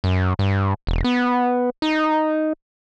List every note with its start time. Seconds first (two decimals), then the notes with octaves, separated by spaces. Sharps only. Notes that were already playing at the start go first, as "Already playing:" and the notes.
0.04 F#2
0.39 G2
0.87 E1
1.04 B3
1.82 D#4